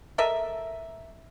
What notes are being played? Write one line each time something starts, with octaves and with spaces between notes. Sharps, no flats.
A4 A#4 D#5 E5